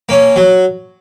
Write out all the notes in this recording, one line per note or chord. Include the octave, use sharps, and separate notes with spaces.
A#3 C#4
F#3